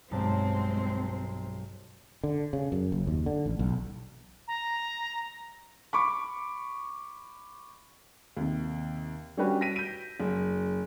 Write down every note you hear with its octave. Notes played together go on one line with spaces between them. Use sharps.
B1 G2 G#3 C4 C5 A5
D3
C#3
F#2
F#1
D#2
D3
A1
B1
A#5
B5 C#6 D6
D#2 C3
G3 C#4 D4 F#4 G4 B4
A#6 B6 D#7
G6 D#7
F#1